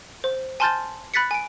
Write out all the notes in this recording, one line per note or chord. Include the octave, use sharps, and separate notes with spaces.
C5
G#5 A5 C6 F6 G6 A6
B5 F#6 A6 B6 C#7
G#5 D7